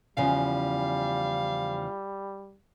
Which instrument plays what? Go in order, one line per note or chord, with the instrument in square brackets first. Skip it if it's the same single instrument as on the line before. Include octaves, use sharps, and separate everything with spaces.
[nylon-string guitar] E2 C#3 F3 [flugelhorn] G3 [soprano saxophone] F5